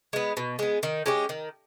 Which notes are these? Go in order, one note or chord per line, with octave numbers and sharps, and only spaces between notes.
G#3 B3
B2
G#3 B3
D#3
G#3 C#4 G4
D#3